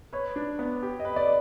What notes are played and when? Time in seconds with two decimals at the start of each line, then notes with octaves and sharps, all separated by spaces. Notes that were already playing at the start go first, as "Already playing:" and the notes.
0.13 B4 C#5
0.36 D4
0.59 B3
0.83 G4
1.00 D#5
1.05 B4
1.16 D5